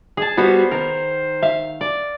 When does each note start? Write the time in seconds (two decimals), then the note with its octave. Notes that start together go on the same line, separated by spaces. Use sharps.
0.17 G#4 A5
0.37 G3 B3 F#4 C5
0.71 D#3 A#4
1.43 E5 F5
1.81 D5